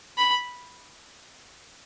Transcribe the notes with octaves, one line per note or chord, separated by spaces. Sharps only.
B5